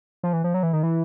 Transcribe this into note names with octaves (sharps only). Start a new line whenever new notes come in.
F3
E3
F3
F#3
E3
D#3
E3